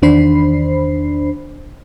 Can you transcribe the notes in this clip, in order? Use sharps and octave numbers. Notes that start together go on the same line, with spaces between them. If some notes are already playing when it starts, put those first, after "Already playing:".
E2 D#3 D4 C5 B5 C7